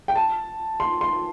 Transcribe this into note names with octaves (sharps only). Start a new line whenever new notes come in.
G5
A5
C6
C6